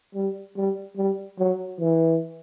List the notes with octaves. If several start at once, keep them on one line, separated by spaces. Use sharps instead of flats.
G3
G3
G3
F#3
E3